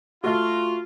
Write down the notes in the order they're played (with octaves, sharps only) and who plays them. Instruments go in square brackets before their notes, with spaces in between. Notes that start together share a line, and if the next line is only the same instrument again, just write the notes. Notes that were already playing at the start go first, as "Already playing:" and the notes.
[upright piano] A3 F#4 [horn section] F4